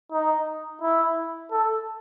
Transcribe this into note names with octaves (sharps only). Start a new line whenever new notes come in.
D#4
E4
A4